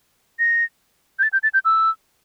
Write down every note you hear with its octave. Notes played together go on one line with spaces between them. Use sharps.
A#6
G6
A6
G6
A6
G6
E6